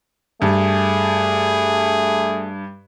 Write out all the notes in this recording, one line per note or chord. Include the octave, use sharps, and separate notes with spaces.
G2 A3 G#4